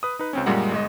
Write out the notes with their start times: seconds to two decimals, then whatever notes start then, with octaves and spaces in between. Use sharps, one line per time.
0.03 B4 D#6
0.19 D#4 B4
0.33 C#2 C4 C#4
0.46 F#2 A#2 G3 G#3 F#5
0.72 G1 G#3 D#5